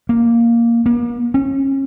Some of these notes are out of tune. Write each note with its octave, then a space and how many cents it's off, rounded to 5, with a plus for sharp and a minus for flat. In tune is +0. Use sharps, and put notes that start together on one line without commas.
A#3 +0
A#3 +40
C#4 -30